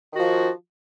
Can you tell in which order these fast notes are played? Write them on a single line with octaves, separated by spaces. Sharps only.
D#3 F#4 F3